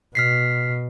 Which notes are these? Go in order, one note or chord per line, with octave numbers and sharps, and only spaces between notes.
B2 F6 B6 C7